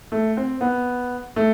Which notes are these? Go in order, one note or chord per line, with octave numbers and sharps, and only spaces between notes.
A3
C4
B3
A3